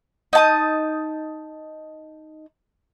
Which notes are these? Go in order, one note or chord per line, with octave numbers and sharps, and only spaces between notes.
D#4 A5 D#6